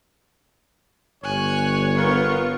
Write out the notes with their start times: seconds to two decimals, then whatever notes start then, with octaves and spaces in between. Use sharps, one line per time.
1.24 G1 C#5 G#5 F#6
1.96 B3 F4 A#4 C#6